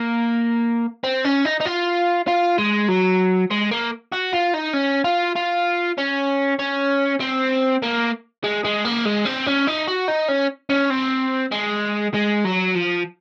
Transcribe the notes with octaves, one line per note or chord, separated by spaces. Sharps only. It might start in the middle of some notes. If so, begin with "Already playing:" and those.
Already playing: A#3
C4
C#4
D#4
D#4
F4
F4
G#3
F#3
G#3
A#3
F#4
F4
D#4
C#4
F4
F4
C#4
C#4
C4
A#3
G#3
G#3
A#3
G#3
C4
C#4
D#4
F#4
D#4
C#4
C#4
C4
G#3
G#3
F#3
F3